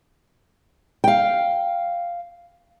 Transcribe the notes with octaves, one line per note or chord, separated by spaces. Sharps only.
F5 G5